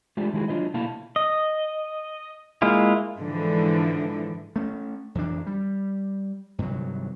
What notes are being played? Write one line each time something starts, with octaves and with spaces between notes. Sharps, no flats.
G#3 A3 D4 F4 G4 E5
D#3 G#3 E4 F#4 G#4
F#3 D4 F4 B4 D#5
B2 A3 A#3 E4 F5 A5
D#5
G#3 A#3 E4 F4
G#2 D3 E3 F3
A3 C#4
F2 E3 D4
G3
G2 C3 D#3 F#3